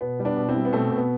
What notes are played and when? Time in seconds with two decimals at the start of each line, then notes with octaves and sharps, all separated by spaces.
0.01 B2 B3
0.19 G3
0.25 B3 D4
0.37 B2
0.49 C4 E4
0.56 G3
0.65 B3
0.73 B2 A3 C4
0.90 B2
0.97 B3